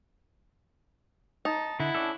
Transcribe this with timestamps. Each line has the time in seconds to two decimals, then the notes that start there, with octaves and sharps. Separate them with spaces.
1.45 D#4 A5
1.80 D3 E4 F#5
1.94 C#4 D4 A4